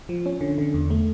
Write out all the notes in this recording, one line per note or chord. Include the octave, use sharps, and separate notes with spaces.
F3
C#4
D3
D3
E2
A3